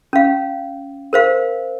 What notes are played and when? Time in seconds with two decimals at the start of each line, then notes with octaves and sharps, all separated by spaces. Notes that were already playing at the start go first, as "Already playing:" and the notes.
0.13 C#4 F5
1.13 A#4 C5 F5